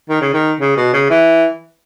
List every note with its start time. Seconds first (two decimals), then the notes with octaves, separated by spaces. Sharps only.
0.09 D#3
0.21 C#3
0.34 D#3
0.60 C#3
0.77 B2
0.93 C#3
1.10 E3